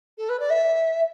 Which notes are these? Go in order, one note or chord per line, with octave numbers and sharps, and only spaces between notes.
A4
B4
D5
E5